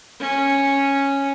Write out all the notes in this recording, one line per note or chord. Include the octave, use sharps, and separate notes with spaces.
C#4